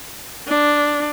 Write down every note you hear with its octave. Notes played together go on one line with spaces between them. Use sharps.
D4